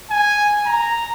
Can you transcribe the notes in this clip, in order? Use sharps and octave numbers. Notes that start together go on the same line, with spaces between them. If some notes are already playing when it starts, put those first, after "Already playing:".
G#5
A#5